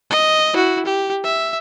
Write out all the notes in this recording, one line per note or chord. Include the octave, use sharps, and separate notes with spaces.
D#5
E4 F#4
G4
E5